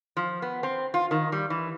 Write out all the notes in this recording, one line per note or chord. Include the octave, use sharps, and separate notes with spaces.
F3
B3
C4
F4
D#3
G3
E3